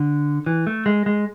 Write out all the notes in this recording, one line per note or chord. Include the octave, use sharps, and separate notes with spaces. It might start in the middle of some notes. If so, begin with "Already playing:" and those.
Already playing: D3
E3
A3
G#3
G#3